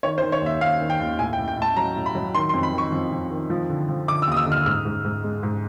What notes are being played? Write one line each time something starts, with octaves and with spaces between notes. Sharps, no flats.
D#3 C#5
C5
D#3
C#5
D#2 E5
D#2 F5
D#3
G5
D#2
A2 G#5
G5
A2
G5
A2 A5
F#3 A#5
A2
B5
F#3
D#3 C6
C6
F2
B5
D#3
C#6
F2
F2
D#3
F3
D3
F3
D3 D6
E6
D#2 D#6
E6
D3
F6
G#2 F6
G#2
G#2
G#3
G#2